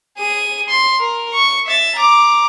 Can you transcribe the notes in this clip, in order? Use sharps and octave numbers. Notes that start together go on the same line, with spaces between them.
G#4 D#7
C6
A#4
C#6
E5 A6
A#5 D6